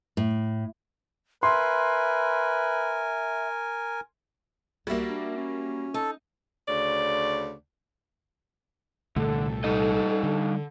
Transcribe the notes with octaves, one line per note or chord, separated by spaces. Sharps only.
A2
A#4 B4 E5 G#5 C6
C2 G3 A#3 F#4 E5
D4
C#4
D#4 A4
D2 C#3 D5
C2 A#2 D3 A3 A4
G3 D#4 D#5
D3